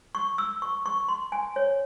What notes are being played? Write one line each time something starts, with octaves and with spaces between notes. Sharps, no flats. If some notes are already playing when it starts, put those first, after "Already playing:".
C#6
E6
C#6
C#6
C6
G#5
C#5